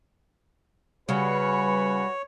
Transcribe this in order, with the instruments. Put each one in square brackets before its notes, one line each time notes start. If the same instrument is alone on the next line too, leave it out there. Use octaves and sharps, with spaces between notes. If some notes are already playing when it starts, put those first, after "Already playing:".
[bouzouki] C#3 [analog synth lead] G3 [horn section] F#4 B4 [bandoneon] C#5